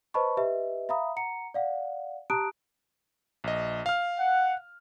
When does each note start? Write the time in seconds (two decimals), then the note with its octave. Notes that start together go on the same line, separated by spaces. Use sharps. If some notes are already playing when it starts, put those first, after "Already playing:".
0.14 B4 C5 D#5 A5 B5 C#6
0.37 G4 B4 D#5 E5
0.89 E5 F5 A#5 B5 D#6
1.16 F#5 A#5 C#7
1.54 D5 F5 F#5
2.30 G4 A5 A#5 D#6 F#6 D7
3.44 A#1 D#5
3.86 F5 F6
4.19 F#5